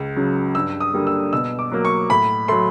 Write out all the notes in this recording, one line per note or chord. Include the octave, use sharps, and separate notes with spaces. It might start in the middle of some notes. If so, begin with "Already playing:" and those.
Already playing: C#2
C#3 F#3
G2 E6
D#6
D3 G3 A#3
E6
B2 E6
D6
F#3 A#3
C#6
A2 B5
F#3 A3 C6